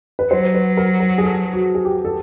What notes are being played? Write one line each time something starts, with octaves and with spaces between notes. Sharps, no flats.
B4
F#3 C5
B4
A#4
A#4
G#4
A4
F#4
G#4
G4
A4